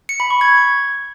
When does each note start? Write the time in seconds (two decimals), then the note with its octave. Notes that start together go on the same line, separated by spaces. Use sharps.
0.09 C#7
0.20 B5
0.30 C#6
0.41 G#6